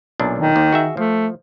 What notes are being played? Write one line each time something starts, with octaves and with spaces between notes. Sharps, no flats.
B1 A#2 D4
D#3
D#2
F#4 G#4 E5
F3 A3